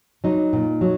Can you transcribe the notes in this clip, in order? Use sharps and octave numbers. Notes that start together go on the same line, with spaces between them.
F#3 D#4
A#2
F#3